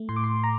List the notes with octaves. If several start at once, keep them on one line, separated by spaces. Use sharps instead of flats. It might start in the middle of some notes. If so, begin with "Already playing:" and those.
Already playing: A3
A2 C6
D6
C6
A#5